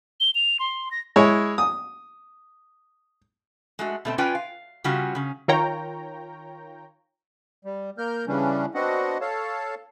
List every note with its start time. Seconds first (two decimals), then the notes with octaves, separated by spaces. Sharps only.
0.20 G7
0.35 F7
0.60 C6
0.91 A#6
1.16 G#3 E4 C#5
1.58 D#6
3.79 G#3 A3 F#4
4.05 B2 A3 C4
4.18 C#4 F4 B4 D5 G5 G#5
4.35 F5
4.84 C#3 G3 C#4 F4 F#4
5.15 C#3 C#4
5.48 D#3 F4 A#4 C#5 G5 A#5
7.65 G3
7.98 A#3 A#4 F6 G6
8.27 C#3 E3 G3 C#4 D4
8.75 B3 C4 D4 F#4 D#5 F#5
9.21 A4 C#5 F5 A5